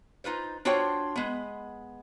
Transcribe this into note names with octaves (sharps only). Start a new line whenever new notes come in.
D#4 F4 B4 C5
D4 F4 F#4 C5 C#5 G5
G#3 B3